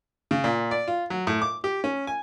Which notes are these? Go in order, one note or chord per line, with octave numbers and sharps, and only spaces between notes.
C#3
A#2
D5
F4
F#3
A2
D6
G4
C#4
G#5